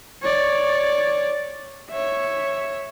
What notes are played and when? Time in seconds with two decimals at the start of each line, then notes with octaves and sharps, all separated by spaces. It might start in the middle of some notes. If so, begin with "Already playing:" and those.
0.22 C#5 D5
1.90 C#5 E5